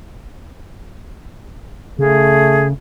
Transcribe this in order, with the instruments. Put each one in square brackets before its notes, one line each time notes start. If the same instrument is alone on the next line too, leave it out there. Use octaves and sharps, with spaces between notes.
[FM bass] C#3 [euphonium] A3 [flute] G#4